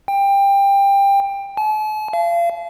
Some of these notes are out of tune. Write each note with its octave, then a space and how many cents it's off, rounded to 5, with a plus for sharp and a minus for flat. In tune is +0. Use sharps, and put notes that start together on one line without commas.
G5 +20
A5 -45
F5 -35